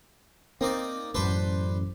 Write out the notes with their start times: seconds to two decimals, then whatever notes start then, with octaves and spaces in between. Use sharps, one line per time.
0.61 A#3 C4 D#4 D5
1.15 E1 A1 F#2 D4 B4 C5